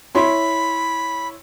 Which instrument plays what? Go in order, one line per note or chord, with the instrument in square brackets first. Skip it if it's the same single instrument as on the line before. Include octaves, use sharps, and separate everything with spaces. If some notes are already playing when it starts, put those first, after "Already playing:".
[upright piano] E4 C#5 C6 [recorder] B5